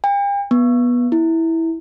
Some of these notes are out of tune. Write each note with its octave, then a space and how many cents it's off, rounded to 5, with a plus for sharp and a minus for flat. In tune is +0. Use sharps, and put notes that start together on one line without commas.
G5 +40
B3 -20
E4 -10